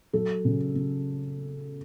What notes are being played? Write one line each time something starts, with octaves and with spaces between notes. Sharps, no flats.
F#3 A4
C#3
C#3